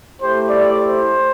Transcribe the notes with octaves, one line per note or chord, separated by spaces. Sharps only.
A3 E4 G4 C5
D5
C5